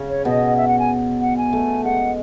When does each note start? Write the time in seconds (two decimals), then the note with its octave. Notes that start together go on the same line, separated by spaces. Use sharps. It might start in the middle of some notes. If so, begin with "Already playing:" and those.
Already playing: C#3 C#4
0.09 C#5
0.25 B2 B3 D#5
0.57 E5
0.68 F#5
0.79 G#5
1.22 F#5
1.37 G#5
1.53 A3
1.84 G#3 F#5